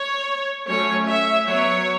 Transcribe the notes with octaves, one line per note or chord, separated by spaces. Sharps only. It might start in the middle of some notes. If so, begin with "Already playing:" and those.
Already playing: C#5
F#3 A3 C#4 C#5
E5
F#3 B3 C#5